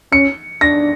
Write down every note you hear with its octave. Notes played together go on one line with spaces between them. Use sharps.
C#4 C#7
D4 A#6